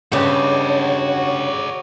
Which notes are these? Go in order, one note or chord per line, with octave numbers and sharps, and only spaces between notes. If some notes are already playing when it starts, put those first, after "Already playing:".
G2 C#3 G#3 C4 F#4 C#5 D5